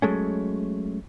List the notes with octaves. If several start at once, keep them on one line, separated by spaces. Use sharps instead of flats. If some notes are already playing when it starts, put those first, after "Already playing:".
F#3 G#3 A3 C#4